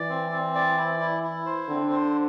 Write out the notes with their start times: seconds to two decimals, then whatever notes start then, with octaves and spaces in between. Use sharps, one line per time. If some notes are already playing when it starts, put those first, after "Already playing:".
Already playing: E3 D5
0.10 C4
0.32 C4
0.55 D5
0.77 E4
1.00 E4
1.23 E4
1.46 C5
1.69 D3 C4
1.91 C5